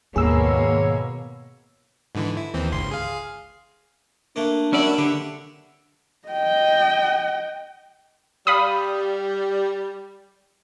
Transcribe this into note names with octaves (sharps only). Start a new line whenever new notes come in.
D#2 G#2 B2 A#3 G#4 C#5 E6
G#2 D3 E3
E4
D#2 E3 C4
G1 C#2 C6
G#4 F5
A3 A#3 D4
F#3 A#3 C#4 D5 E5 F#5 B5
D3 G4
D#5 G5
G3 F5 B5 D#6